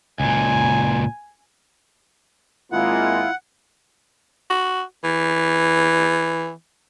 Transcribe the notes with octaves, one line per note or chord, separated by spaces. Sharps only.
C#2 A#2 G#5
G#1 G#3 A#3 E4 F4 F#5
F#4
E3